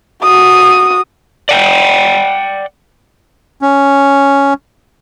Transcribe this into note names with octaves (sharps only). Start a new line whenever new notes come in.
F#4 D#6
D5 F#5 G5
C#4